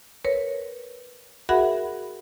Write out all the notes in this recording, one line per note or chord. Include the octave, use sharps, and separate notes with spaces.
A#4 B4 C#5
F#4 G#4 A#4 E5 F#5 B5